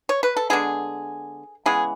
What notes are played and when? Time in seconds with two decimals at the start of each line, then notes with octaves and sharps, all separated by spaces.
0.09 C#5
0.23 B4
0.37 A4
0.50 D3 G#3 B3 G#4
1.66 C#3 E3 G#3 B3 G#4